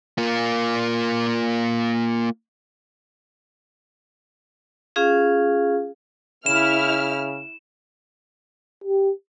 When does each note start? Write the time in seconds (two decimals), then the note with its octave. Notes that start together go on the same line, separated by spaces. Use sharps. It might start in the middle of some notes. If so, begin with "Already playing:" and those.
0.18 A#3 F4
4.96 C#4 F4 G#4 F5
6.46 C#3 E4 F6 E7
8.84 G4